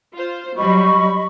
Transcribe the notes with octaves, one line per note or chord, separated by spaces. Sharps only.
F4 C5
F#3 G3 D#5 B5 C#6